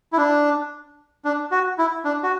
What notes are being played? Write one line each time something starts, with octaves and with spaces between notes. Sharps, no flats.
E4
D4
D4
F#4
E4
D4
F#4